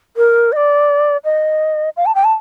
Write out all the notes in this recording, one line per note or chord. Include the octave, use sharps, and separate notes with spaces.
A#4
D#5
D5
D#5
F5
A5
G5
A5